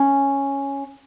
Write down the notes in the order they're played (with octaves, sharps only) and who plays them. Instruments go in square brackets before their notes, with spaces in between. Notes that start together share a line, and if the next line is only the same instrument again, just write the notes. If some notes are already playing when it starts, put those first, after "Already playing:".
Already playing: [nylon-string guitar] C#4